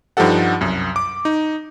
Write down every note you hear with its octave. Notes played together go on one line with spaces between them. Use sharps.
G2 F3 D#4 G4 A4 F#5
C2 F#2
D6
D#4